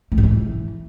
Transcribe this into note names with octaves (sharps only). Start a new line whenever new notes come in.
A3
G#2
E3